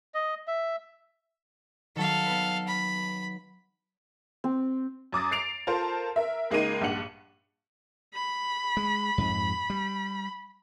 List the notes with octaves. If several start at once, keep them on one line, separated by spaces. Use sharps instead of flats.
D#5
E5
D#3 F#3 A4 F5
B3 B4
B5
C4
F#2 D6 D#6 A6
A6 C7 D7 F7
F4 A4 A#4 C5 A5
A#4 E5
C#2 G#3 A#3 D#4 D#5 D#7
A#1 G2 D4 F#5 C#7 F#7
B5
G#3
F2 G#2
G3